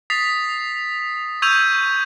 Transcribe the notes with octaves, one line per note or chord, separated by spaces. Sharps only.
D#6 A6 B6 C7 F7
C#6 E6 G6 G#6 D#7 F7